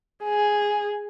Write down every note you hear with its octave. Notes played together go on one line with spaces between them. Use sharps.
G#4